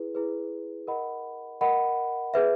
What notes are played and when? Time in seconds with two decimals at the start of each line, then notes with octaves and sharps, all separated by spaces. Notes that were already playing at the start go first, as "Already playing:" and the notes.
Already playing: E4 G#4 B4
0.15 E4 G#4 B4
0.88 A#4 D#5 F#5 B5
1.61 A#4 D#5 F#5 B5
2.34 G#4 B4 E5